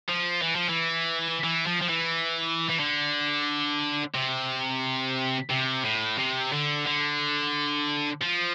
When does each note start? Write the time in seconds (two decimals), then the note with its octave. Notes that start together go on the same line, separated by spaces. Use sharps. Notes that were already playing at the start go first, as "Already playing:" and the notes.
0.09 F3
0.42 E3
0.56 F3
0.69 E3
1.44 E3
1.66 F3
1.81 F3
1.89 E3
2.70 E3
2.80 D3
4.15 C3
5.50 C3
5.85 A2
6.18 C3
6.52 D3
6.86 D3
8.22 F3